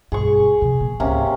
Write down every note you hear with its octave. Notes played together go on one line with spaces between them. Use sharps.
B1 G2 G#4 C#6
C3 F3
A#2
C#2 G#2 C3 A#3 C#4